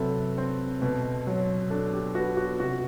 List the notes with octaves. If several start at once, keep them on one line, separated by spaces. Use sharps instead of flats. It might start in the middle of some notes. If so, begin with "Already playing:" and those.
Already playing: C3 F#3 A4 B4
C4
B2
F#3
D4 A4
G4
B3 F#4
F#4
C3 F#4